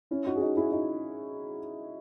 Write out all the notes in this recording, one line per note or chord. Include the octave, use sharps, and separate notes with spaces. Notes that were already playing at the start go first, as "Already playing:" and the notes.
C#4 E4
D#4 F#4
G#4
D#4 F#4
E4 G#4
D#4 F#4